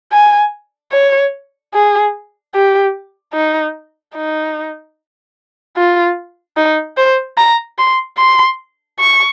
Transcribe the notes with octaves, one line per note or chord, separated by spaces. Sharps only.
G#5
C#5
G#4
G4
D#4
D#4
F4
D#4
C5
A#5
C6
C6
C#6